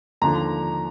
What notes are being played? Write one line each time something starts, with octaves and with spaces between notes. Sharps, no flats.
D#2 D3 F3 A#5